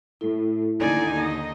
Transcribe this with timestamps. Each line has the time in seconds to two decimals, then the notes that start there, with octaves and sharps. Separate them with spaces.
0.21 A2 E4 A4
0.79 D#2 D3 D#4 D5 G#5
1.18 D#5